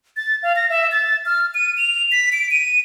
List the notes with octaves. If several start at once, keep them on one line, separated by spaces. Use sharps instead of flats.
A6
F5
A#6
E5
A6
F6
D#7
F7
B6
D7
D#7